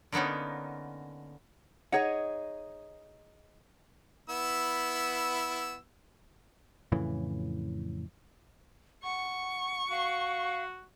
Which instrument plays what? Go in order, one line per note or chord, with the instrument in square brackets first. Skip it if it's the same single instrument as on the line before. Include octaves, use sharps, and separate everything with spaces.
[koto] D3 A#3 B3 C#4 D#4
[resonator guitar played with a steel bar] D#4 G#4 D#5 [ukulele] C#5 F#5
[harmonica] B3 E4 E6
[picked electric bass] F2 A2 C#3 E3
[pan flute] F#5 [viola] C#6
[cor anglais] F#4 [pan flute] F5